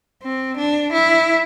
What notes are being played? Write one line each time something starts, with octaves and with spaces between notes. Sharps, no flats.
C4
D4
E4